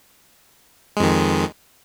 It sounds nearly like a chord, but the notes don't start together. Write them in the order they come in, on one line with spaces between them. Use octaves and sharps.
G#3 F2 D#3